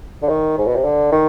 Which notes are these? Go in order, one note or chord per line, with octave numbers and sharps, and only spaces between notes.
D3
D#3
G#2
B2
C3
D3
D#3